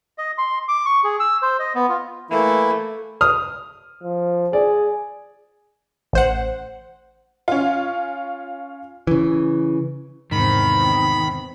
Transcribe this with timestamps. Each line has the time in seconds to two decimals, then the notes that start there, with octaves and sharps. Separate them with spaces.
0.18 D#5
0.38 C6
0.68 D6
0.86 C#6
1.04 G#4
1.20 E6
1.42 C5
1.59 D#5
1.75 B3
1.89 F4
2.30 E3 A3 A#3 E4
3.21 D#6 F6
4.03 F3
4.53 G#4 D5
6.13 A1 C5 F#5
7.48 C#4 F4
9.07 C#3 E3
10.31 E2 G#2 C3 D#3 C4 B5